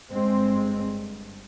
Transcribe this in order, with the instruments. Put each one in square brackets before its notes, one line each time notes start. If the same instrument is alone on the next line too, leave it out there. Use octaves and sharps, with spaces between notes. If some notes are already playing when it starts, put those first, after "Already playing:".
[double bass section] G1 G2 G#3 C4